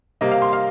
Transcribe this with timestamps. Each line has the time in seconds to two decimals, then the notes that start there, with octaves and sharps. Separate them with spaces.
0.21 C3 G3 A#3 D#5
0.32 F5
0.42 C6
0.53 F5